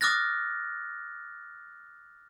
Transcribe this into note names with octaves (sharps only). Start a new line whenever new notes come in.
D6 D#6 F6 F#6 A6 A#6